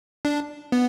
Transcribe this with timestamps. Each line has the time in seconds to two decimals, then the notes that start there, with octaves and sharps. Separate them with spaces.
0.25 D4
0.72 B3